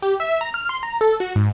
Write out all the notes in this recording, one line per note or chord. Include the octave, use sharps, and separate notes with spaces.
G4
E5
A#5
F6
C6
A#5
A4
F#4
G#2